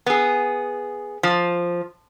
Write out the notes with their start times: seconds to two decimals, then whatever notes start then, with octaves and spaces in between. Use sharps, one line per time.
0.06 B3 G#4
1.23 F3